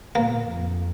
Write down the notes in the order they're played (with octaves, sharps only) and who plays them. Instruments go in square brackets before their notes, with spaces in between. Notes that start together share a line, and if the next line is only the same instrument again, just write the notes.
[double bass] A#2 [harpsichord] A#3
[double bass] F2